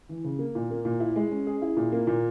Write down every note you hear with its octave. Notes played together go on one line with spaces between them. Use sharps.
E3
C#3
A#3
A#2
A#3
A#2
E4
G#3
C#4
G#4
E4
A#2
A#3
A#2